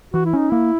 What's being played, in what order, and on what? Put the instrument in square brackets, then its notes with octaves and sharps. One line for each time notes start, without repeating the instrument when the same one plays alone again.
[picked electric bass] E3 [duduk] F#4
[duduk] E4
[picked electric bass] C#4 [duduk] D#4
[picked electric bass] A#3 [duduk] E4